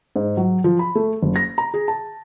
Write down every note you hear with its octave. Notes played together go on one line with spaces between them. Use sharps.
G#2
F#3
F3
B5
A3
F#1
A#6
A#5
G#4
A5